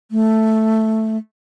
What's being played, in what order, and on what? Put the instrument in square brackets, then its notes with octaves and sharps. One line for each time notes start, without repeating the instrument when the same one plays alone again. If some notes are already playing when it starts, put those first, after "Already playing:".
[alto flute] A3